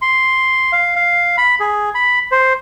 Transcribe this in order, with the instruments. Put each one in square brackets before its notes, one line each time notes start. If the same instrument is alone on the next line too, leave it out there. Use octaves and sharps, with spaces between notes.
[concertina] C6
F5
F5
B5
G#4
B5
C5